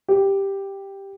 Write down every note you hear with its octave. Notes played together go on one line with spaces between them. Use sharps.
G4